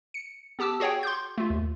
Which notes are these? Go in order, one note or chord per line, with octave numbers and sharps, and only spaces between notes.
C#7
B3 G4 A5 D6 E6
F#4 G#4 C#5 F#5 G5
C6 D6 G6
A3 F4
D#2